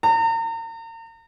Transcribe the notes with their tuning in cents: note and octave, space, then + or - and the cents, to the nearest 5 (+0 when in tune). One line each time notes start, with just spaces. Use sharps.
A#5 -40